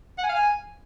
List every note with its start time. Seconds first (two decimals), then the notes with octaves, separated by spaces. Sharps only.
0.18 F#5
0.24 G#5
0.29 F5
0.34 G#5